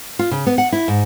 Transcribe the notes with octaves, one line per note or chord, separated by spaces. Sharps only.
F4
C#3
B3
F#5
E4
G#2